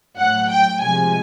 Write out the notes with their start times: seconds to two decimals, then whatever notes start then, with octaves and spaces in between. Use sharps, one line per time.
0.17 A2 F#3 F#5
0.49 G5
0.80 C3 F3 G#3 G#5